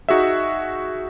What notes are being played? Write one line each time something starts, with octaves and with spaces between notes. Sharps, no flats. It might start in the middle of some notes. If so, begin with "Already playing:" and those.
D#4 F#4 G#4 E5